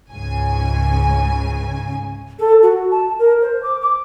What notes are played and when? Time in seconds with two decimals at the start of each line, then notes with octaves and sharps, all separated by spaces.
0.10 C#2 G#2 C#3 G#5
2.39 A4
2.63 F#4
2.91 A5
3.19 A#4
3.42 C5
3.63 D6
3.81 D6